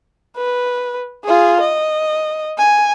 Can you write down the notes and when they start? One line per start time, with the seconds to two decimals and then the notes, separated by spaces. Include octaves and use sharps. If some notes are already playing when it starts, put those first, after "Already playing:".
0.37 B4
1.24 F4 G#4
1.61 D#5
2.58 G#5